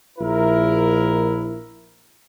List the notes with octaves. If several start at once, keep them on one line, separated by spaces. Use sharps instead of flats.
A#1 E4 A#4